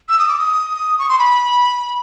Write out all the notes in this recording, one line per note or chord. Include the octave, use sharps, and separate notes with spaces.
E6
D#6
D6
D#6
C#6
C6
B5